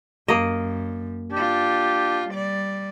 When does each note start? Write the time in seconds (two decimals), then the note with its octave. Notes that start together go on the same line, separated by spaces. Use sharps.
0.28 F#2 A#3 D#5
1.32 D4 F4 G4
2.29 G3 D5